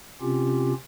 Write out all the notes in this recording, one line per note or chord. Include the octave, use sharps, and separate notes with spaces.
C3 C4 C#4 F4 G4